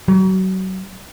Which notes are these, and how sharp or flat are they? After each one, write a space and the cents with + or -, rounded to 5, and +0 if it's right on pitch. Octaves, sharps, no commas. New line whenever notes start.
F#3 +30